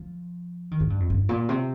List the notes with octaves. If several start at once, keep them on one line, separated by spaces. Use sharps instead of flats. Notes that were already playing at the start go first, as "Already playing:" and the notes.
Already playing: F3
D#3
G#2
G2
F2
G2
A#2
C3